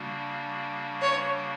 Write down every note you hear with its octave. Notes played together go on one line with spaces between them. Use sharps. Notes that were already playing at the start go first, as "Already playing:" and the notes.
Already playing: C#3 G3 A#3 D4 F#4
C#5